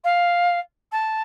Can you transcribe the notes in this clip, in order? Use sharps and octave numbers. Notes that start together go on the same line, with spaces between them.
F5
A5